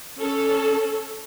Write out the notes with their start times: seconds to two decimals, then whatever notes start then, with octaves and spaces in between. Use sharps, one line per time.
0.19 C#4 A4